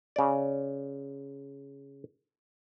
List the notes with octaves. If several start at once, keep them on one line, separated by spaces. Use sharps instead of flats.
C#3 D5